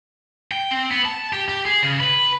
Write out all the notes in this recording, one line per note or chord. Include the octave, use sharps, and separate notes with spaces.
G5
C4
B3
A5
G4
G4
G#4
C#3
B4